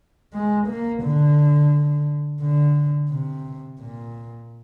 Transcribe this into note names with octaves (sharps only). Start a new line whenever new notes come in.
G#3
A#3
D3
D3
C3
A#2